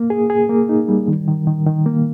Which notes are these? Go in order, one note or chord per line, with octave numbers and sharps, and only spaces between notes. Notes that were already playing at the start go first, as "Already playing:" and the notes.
Already playing: A#3
G#4
G#4
A#3
D#4
G3
D#3
D#3
D#3
D#3
A#3